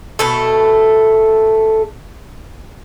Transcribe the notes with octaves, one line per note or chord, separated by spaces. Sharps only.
B2 A3 A4